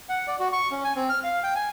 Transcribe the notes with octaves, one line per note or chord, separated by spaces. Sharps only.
F#5
D5
F#4
C#6
C#4
G#5
C4
F6
F5
G5
G#5